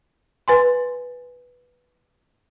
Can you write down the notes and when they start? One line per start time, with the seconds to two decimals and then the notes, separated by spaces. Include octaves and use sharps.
0.48 B4 G#5 C6